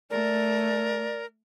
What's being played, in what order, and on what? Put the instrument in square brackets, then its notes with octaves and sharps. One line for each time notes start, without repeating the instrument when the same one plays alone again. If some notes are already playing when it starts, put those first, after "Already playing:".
[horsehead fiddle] A3 [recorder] A#4 [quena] D5